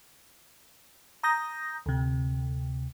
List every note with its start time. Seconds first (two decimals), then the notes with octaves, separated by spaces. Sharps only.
1.23 A#5 D#6 G6 A#6
1.86 D2 C3